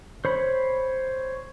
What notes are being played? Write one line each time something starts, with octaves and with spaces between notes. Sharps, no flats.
C5 C#5 B5